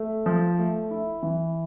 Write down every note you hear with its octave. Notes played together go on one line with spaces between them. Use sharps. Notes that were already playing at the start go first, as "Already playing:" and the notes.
Already playing: A3
F3
A3
E4
E3